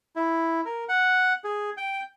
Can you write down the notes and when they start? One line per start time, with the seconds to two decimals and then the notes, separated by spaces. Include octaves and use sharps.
0.16 E4
0.65 A#4
0.89 F#5
1.44 G#4
1.77 G5